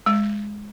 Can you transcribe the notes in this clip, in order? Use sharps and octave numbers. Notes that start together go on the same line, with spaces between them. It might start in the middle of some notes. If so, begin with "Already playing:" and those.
G#3